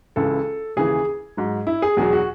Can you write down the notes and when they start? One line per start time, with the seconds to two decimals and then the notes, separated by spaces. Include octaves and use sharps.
0.16 C#2 C#3 E3 A4
0.76 D#2 C#3 E3 G#4
1.37 G#2 F#3
1.67 E4
1.82 G#4
1.97 E2 B2 F#3 G#4
2.13 F#4